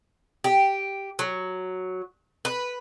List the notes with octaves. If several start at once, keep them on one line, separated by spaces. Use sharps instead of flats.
G4
F#3
B4